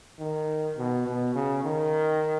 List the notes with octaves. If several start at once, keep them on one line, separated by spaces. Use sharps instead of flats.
D#3
B2
B2
C#3
D#3